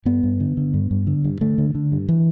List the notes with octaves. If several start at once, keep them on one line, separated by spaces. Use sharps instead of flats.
G2 B3
G2
D3
D3
G2
G2
D3
G2
D3 A3
D3
D3
G2
E3